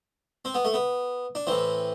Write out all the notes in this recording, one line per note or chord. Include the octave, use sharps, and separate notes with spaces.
C4
B3
A3
B3
D4
A2 E3 C4